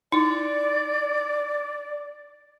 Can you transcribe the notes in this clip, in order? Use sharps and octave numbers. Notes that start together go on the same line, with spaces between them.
D#4 E4 D5